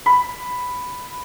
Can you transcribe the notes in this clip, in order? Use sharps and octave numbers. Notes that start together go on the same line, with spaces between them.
B5